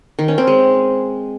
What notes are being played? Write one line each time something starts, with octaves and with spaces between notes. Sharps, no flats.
D#3
C#4
C4
G#3